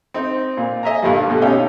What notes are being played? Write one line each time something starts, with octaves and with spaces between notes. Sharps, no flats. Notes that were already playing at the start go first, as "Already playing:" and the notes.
C4 D#4
A#2
D#5 E5 G#5 A#5
G2 A#2 D3 G3
B2 A3 G4
C#4 D#4 G4 A4 F5 G5